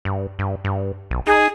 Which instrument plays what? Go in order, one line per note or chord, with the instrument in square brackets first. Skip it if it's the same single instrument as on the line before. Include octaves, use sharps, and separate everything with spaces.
[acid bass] G2
G2
G2
B1
[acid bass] D#4 [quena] G#4